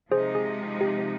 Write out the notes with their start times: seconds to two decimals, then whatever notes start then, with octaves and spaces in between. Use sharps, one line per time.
0.11 C3 F3 G#3 D#4 G#4 C5
0.35 G#4
0.81 G4